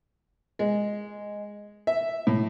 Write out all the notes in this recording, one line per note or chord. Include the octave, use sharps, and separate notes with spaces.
G#3
E5
A2